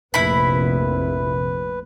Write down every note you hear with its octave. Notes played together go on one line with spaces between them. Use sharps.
F1 A#1 E4 B4 B5